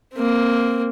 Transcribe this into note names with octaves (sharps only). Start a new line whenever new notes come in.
A#3 C4